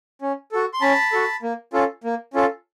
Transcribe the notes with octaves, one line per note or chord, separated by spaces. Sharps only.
C#4
F#4 A4
C6
C#4 A5 B5
F#4 A4
A#3
C#4 F4 A4
A#3
C#4 F4 A4